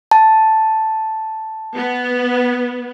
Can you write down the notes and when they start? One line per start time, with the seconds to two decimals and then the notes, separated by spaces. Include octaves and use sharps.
0.11 A5
1.76 B3